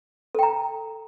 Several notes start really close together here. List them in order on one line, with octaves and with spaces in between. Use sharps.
A4 G5 A#5